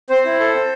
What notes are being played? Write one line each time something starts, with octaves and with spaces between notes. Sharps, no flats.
C4 C5
E4
A4
C4